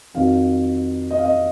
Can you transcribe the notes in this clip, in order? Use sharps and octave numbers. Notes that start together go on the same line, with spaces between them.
F2 D#3 F#3 F5
D#5
F5
D#5